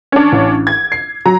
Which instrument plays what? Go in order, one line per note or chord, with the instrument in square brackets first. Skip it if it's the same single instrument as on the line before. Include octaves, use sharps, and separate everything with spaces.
[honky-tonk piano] C#4 D4
[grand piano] A1
[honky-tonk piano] G#6
[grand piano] C7
[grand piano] F#3 [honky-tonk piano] A#5